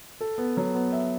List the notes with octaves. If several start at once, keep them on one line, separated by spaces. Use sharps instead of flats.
A4
B3
F#3
B3
E5